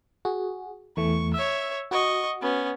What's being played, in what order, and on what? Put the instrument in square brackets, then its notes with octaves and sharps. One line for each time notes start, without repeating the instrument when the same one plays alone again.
[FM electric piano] F#4 G#4
[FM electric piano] E2 E3 A3 [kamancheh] C#6
[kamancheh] C#5 E5 [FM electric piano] E6
[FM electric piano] F#4 [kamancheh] D#5 C#6
[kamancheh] B3 C#4